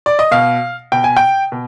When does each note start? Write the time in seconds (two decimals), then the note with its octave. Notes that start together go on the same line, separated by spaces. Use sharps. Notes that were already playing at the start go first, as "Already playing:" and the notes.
0.06 D5
0.19 D#5
0.31 B2 F5
0.92 B2 G5
1.04 G#5
1.17 G5
1.52 B2